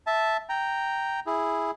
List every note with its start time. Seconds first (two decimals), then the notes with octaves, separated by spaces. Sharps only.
0.07 E5 A5
0.49 G5 A#5
1.27 E4 G#4